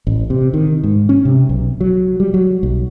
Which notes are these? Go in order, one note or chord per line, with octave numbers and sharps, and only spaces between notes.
A1
C3
D#3
G#2
C#4
C3
B1
F#3
G3
F#3
B1